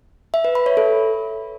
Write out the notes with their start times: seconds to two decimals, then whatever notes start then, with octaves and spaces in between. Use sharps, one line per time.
0.34 E5
0.45 B4
0.55 B5
0.66 C#5
0.77 A4